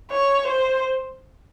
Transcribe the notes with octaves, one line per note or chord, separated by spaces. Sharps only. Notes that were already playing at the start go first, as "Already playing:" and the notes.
C#5
C5